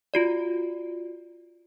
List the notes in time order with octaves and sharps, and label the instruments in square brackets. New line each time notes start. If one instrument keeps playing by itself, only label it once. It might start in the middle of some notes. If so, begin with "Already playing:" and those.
[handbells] F4 F#4 D5